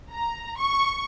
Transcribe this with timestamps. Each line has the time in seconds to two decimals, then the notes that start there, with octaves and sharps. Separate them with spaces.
0.13 A#5
0.59 C#6